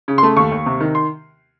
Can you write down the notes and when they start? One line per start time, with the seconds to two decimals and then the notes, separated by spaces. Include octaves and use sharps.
0.08 C#3
0.18 C6
0.23 A3
0.36 D#2 C#6
0.52 D#2
0.66 C3
0.80 D#3
0.95 C6